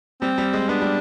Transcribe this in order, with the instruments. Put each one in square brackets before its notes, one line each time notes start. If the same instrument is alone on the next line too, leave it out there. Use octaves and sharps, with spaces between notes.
[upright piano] G3 [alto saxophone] C4
[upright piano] G3
G#3
[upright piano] B3 [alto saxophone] D4
[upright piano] G3